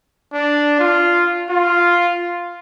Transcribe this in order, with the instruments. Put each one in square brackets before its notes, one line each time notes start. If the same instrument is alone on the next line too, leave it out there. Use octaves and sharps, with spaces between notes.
[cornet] D4
F4
F4